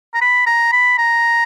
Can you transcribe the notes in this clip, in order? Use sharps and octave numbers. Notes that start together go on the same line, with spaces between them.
A#5
B5
A#5
B5
A#5